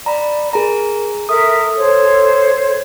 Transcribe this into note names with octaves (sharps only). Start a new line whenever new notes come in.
D5 A#5 B5
G#4 A#4 A#5
A4 A#4 E5 D#6
C5 C#5